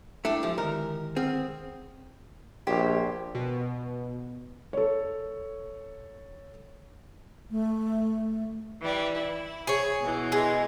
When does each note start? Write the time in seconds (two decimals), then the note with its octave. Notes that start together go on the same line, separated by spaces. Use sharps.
0.25 A3 D4 E4 G5
0.43 F3 G#3 G4 E6
0.58 D3 D#3 G#3 A#4
1.16 C4 G#4 F#5 F6
2.67 A#1 G4 C5 C#5
3.35 B2
4.73 A4 C#5
7.51 A3
8.80 E3 G3
9.14 E4
9.67 G#4 C#5
10.00 B2 E3
10.32 G#3